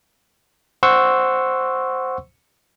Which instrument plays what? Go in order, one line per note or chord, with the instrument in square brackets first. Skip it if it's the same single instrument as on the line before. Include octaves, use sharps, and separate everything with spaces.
[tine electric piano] C5 F#5 C6 C#6 E6